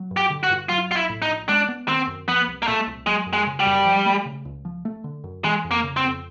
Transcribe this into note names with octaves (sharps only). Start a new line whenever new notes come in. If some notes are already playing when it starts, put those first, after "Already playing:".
Already playing: F#3
G2
G4
D3
F#4
G2
F#3 F4
A#1 F4
E4
A2
D#4
A#1
G#3 D4
B3
D#3 C4
F#2
F3 B3
C2
A#3
A#2 A3
C2
F#3 G#3
F#2
G#3
C#3
G3
F#2
F3
A3
C#3
C#2
F3
A3
D3
F#2
E3 G#3
F2
A#3
C#3
C4
F2